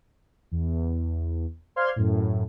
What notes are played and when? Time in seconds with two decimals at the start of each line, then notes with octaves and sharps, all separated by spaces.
0.52 E2
1.76 C5 D5 F5 C6 F6 G#6
1.96 F#2 A2